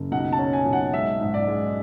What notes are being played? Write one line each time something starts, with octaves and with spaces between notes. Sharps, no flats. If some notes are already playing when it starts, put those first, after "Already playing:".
Already playing: F#1
B1 F#5
A5
C#4
G#5
B1
F#5
G#3 E5
G#2
D5
G#3